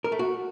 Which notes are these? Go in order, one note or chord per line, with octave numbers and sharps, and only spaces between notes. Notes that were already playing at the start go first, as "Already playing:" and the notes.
A#4
A3
F#4